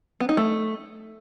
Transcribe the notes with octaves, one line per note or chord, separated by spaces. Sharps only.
B3
D#4
A3